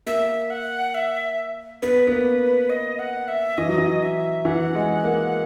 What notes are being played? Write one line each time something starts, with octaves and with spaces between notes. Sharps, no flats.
A#3 E5
F#5
E5
B3 B4
B3
A#3
D#5
F#5
E5
E3 D#5
F#3
E3
E5
E3 F#5
G#3
A#3